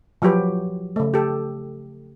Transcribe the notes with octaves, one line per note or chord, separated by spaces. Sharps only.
F3 F#3 F#4 G4 B4
C#3 A3
G4 A4